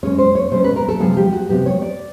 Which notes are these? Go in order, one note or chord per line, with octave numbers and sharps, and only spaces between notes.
B2 G#3 C#4 C#5
C5
C#5
B2 G#3 C#4 C5
B4
A#4
A4
C3 F3 G#3 B3 G#4
G4
F#4
C3 F3 G#3 B3 G4
C#5
D5